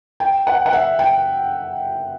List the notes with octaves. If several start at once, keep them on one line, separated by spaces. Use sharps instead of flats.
G5
F#5
F#5
E5
G5